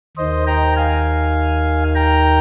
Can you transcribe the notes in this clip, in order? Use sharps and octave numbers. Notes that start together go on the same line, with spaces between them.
D#2 D#3 C5 D#5
G5 A#5
F5 G#5
G5 A#5